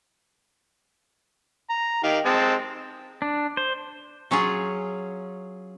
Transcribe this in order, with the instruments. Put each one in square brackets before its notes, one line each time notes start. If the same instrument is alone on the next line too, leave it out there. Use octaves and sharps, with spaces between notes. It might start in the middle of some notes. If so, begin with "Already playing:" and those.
[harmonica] A#5
D#3 G4 F5
G#3 C4 A5
[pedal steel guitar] D4
C5
[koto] F#3 C#4 F4 G#4